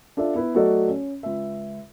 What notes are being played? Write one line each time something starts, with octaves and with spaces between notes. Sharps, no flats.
D4 F4 A4 D5 E5
B3 E4 B4
F#3 A3 F#4 A4 D5 D#5
C#4
C#2 E5